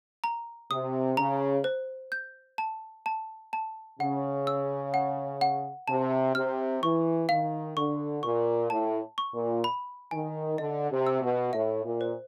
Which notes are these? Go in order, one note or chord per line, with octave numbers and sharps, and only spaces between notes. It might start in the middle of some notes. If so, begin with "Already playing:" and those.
A#5
C3 D#6
C#3 A#5
C5
G6
A5
A5
A5
C#3 F#5
E6
F#5
F#5
C3 A5
C3 F6
E3 C#6
D#3 F5
D3 C#6
A#2 C#6
A2 A5
C#6
A#2
B5
D#3 G#5
D3 D#5
C3
E6
B2
A2 E5
A#2
C5